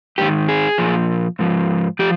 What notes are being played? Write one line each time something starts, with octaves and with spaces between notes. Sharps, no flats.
G#2 D#3 G4
G#4
A#2 F3
G#2 F3
F3 G4